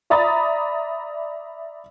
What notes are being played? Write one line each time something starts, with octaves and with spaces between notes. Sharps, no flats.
D5 E5 A#5 B5 D#6 A6